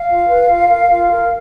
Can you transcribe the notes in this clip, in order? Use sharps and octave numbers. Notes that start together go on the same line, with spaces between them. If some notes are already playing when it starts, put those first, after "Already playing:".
Already playing: F5
F4
B4
F4
A#4
F4
A#4